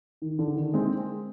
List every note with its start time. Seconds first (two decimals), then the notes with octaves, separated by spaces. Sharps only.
0.22 D#3
0.39 D3
0.56 D#3
0.74 G#3 C4